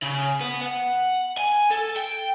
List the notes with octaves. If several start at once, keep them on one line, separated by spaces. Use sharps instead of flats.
C#3
B3
F#5
G#5
A4
G5